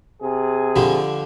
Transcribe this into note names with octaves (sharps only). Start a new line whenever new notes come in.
C3 G#4
D3 F3 G3